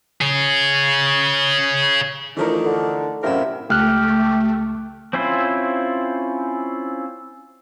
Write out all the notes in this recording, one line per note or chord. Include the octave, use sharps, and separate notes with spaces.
G#4 C#5
E3 F3 A3 D4 D#4 A#4
D3
F#2 A2 C3 E4 F4 A#4
C#2 A3 G4 F6 F#6
C4 C#4 E4 F4 C5